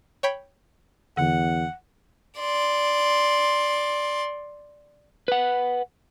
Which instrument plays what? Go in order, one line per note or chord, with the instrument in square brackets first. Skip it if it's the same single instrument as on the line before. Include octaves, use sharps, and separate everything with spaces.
[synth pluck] C#5 G5 B5
[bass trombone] E2 [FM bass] D3 [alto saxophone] F#5
[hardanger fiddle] D5 C6
[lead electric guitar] B4 F#5